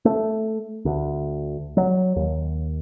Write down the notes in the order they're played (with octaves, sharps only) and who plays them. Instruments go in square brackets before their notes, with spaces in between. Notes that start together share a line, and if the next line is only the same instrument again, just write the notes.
[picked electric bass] A3
D2
F#3
D#2